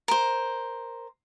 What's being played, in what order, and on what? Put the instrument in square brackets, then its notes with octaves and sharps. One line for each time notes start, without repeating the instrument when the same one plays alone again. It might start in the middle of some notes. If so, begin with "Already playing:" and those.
[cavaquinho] A#4 C5